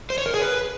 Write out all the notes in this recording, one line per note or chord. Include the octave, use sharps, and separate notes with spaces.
C5
C#5
A#4
G#4
B4